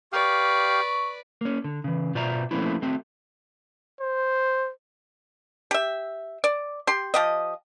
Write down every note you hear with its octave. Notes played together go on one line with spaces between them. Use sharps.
G4 B4 D5 F5 C#6
A#3 C#4
D3
C#3 E3
B2 F4 C5 D5 E5 A#5
F3 A3 A#3 C4 C#4 E4
A3 C4 F#4
C5
G4 E5
D5
G4 C6
F3 G4 D#5